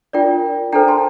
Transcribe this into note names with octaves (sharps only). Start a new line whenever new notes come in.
D4 F4 A#4 D5 G5
D4 A4 C5 G5 A#5
A5 C6